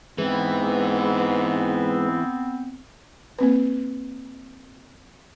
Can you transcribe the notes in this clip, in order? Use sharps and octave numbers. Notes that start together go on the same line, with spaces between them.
G#2 E3 G#3 B3 C4 B4
A#3 C4 B4